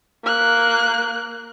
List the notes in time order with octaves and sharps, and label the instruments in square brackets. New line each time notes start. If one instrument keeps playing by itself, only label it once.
[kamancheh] A#3 F#6